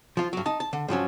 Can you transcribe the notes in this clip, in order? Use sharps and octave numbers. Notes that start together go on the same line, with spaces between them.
F3 F4
G2 F#3
D#4 A5
A5
D3
G2 F3 F#3 C#4